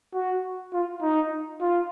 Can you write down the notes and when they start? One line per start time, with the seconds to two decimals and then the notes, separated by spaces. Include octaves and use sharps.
0.14 F#4
0.73 F4
1.02 D#4
1.61 F4